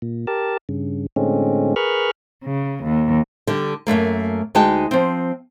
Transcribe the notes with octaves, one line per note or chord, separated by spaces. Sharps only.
A#2
G4 A#4 A5
G2 C#3
A2 D3 G#3 C4 C#4
G#4 A#4 B4 B5 C#6 F6
C#3
D#2
D3 G3
F#2 B2 A3 A#3
D2 G#3 D#4 F#4 G5 A5
F3 C4